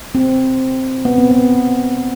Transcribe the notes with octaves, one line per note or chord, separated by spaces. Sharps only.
C4
B3
C4
B3